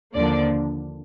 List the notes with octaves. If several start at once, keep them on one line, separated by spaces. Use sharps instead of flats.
D#2 D3 F3 A#3 D4 D5